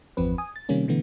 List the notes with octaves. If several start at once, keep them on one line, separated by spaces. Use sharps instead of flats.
G1 E2 F3 C4 B4
G#5 D#6
A6
C3 D#3 G3 A#3 C#4
B2 D3 E3 A3 B3